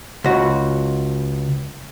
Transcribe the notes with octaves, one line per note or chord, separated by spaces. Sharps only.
C#2 F#4